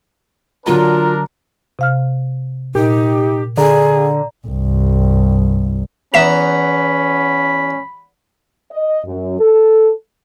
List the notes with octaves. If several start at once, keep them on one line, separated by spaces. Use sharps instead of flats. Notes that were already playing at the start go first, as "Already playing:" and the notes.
D3 F#3 D4 F4 A#4 A#5
C3 F5 F6
A#2 D#4 G4
D3 G#4 D5 A#5
C2 G2
E2 B3 C#4 E5 A#5 B5 B6 E7
D#5
F#2
A4